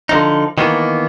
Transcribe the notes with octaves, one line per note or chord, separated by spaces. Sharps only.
D3 F3 D#4
D#3 E3 A#3 B3